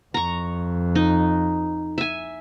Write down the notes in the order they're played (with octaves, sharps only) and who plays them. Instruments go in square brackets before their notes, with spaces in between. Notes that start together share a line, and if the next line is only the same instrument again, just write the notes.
[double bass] F2 [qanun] A#5 C#6
[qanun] D#4
E5 G#5